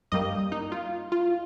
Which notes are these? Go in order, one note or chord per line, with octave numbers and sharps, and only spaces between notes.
G2 G3 A#3 D#5
D#4
F4
F4